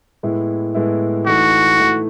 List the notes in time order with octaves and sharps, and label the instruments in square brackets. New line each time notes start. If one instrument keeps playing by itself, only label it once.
[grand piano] A2 G#3 B3 E4
A2 G#3 B3 E4
[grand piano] E3 A3 D#4 [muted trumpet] F#4
[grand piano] E3 A3 D#4